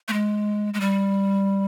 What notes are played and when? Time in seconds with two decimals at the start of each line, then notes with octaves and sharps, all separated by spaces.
0.08 A3
0.13 G#3
0.74 G#3
0.80 G3